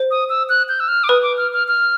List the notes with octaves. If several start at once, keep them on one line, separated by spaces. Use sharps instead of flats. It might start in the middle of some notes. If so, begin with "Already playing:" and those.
Already playing: C5
D#6
E6
F#6
G6
E6
F6
D6
B4 D#6
D6
F6
F6
F6